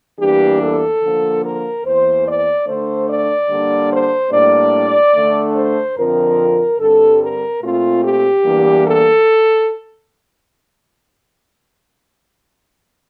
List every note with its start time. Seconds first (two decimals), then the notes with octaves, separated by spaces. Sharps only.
0.19 E2 E3 G3 A#3 D4 G4
0.61 A4
1.02 D3 F3 A#3
1.44 A#4
1.84 E2 E3 A#3 C5
2.26 D5
2.67 D3 A3 D4 C5
3.08 D5
3.49 D3 G3 A#3 D4
3.90 C5
4.31 A2 G3 A#3 D4 D5
5.14 D3 A3 D4
5.55 C5
5.96 F2 D3 F3 C4 A#4
6.78 G2 D3 G3 C4 A4
7.20 A#4
7.61 A#2 A3 C4 F4
8.02 G4
8.44 E2 E3 G3 A#3 D4
8.85 A4